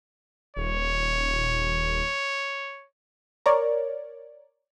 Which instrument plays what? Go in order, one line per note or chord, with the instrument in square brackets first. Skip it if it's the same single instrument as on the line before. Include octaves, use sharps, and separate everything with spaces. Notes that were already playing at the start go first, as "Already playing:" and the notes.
[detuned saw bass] D#1 [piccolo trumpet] C#5
[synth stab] A#4 C#5 D5